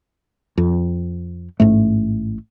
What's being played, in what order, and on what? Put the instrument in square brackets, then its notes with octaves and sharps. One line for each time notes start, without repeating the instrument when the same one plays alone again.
[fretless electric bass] F2
A1 G#2 A3